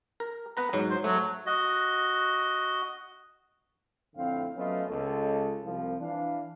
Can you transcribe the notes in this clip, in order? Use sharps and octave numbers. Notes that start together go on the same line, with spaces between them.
A#4
B3 B4 A#5
G#2 F#3
C5
F#3 A3
F#4 D#5
F2 A2 D3 C4 F5
F#3 A3 B3 C#4 F4 D#5
C#2 A4
C2 F3
E3 D4 F5